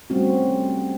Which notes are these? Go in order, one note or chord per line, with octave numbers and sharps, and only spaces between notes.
G3 A3 C4 C#4 F#4